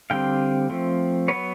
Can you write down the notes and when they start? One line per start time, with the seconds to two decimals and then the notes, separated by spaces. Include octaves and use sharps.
0.10 D3 G3 C4 F5 G5
0.70 F3 A3 C4
1.28 F#3 B3 B4 C#5